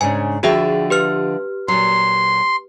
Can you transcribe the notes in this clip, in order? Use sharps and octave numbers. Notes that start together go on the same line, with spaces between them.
G#2 C#3 D4 G#5
D3 F3 F#4 G#4 E5 G5
G4 B4 F6
A#2 F#3 C6